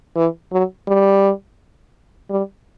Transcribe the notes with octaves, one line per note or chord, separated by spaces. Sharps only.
E3
F#3
G3
G3